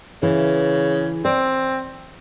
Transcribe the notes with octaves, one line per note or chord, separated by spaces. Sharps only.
C#3 E3
C4 D5